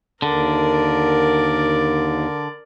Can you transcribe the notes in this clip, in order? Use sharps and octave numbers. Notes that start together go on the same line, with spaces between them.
D#2 D3 A#4 D5